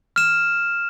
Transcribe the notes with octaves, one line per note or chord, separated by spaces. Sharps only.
F6 E7